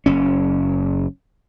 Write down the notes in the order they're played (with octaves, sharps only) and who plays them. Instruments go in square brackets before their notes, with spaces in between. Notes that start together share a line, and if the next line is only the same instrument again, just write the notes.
[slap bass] F#1 C#4